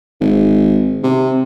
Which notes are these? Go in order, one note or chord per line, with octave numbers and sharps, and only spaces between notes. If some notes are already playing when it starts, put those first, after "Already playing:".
G#1
C3